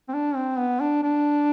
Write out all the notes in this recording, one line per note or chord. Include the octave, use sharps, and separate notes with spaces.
C4
D4
C4
B3
D4
D4